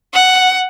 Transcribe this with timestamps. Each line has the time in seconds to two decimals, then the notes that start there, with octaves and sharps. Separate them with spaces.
0.13 F#5